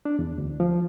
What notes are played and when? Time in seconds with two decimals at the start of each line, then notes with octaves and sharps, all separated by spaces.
0.05 D4
0.19 E2
0.38 D2
0.60 F3